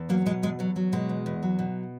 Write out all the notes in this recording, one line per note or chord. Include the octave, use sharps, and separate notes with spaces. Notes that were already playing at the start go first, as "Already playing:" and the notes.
Already playing: E2
F#3 A#3
B2 G#3
E2 G#3
E2 F#3
F#3
B2 G#3
E2
E2
F#3
B2